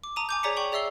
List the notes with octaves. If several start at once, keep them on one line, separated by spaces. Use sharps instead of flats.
D6
A5 A#5 D#6 D#7
G#5 D6 G6
G#4 C#5 D5 A#5 B6 C#7
G5 C#6 F#7
G#4 D5 E5 E6 C7 G7